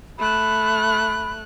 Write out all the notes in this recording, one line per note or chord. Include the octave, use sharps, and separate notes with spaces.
A3 B5 F#6